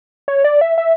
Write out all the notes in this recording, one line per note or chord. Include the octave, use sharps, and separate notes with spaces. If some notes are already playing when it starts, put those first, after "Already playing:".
C#5
D5
E5
E5